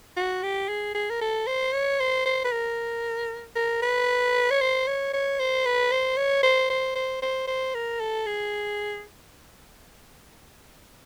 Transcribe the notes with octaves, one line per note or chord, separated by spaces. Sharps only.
F#4
G4
G#4
G#4
A#4
A4
C5
C#5
C5
C5
B4
A#4
A#4
B4
C#5
C5
C#5
C#5
C5
B4
C5
C#5
C5
C5
C5
C5
C5
A#4
A4
G#4